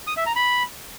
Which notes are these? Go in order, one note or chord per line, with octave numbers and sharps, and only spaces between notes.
D#6
E5
A#5
B5